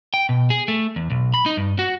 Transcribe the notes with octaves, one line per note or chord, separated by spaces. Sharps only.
G5
B2
G#4
A3
E2
B1
B5
D#4
G2
F#4